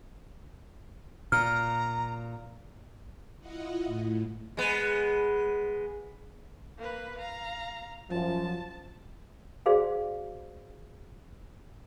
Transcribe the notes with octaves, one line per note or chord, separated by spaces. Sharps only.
A#2 A#5 F6
E4 F4 D#5 F#5
A2
G#3 B3
A#3 B4
F5 A#5
F#2 F3 A5
F#4 G#4 C5 D5 F5